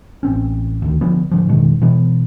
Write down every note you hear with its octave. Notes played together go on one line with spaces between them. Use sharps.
A1 C4 C#4
D2 D#3
D3 F3 B3
A2 D3 F3
F1 B2 D#3 G#3
B2 E3 B3